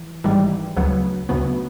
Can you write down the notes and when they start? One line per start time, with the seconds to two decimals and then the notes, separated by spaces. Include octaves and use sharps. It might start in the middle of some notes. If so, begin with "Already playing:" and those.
Already playing: E3
0.24 G#1 G#2 E3 G3
0.76 D2 C#3 F#3 B3
1.29 D2 C#3 F#3 B3